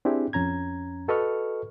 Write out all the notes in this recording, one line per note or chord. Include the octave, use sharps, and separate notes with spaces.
C4 D4 E4 G4 G#4
F2 C#4 A#5 G#6
F#4 A4 B4 D#5 C#6 F6